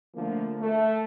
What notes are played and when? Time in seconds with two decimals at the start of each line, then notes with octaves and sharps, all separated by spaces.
0.16 D3 F3 A3 A#3
0.61 A3